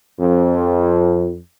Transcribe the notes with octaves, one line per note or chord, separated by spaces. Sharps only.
F2